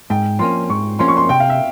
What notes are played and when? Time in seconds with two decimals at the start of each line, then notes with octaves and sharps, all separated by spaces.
0.10 G#2 G5
0.39 F3 A#3 C#4 C6
0.70 G#2 C#6
0.99 F3 A#3 C#4 C6
1.08 C#6
1.16 C6
1.29 C3 G5
1.40 F5
1.49 E5